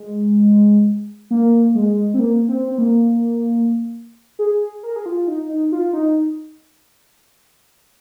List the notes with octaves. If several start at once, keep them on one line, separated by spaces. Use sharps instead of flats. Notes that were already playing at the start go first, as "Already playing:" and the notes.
Already playing: G#3
A#3
G#3
C4
A#3
C4
C4
A#3
G#4
A#4
G#4
F4
D#4
D#4
F4
D#4